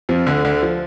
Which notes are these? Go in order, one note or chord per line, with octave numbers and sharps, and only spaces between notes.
F2 F3
D2 D3
D2 D3
F3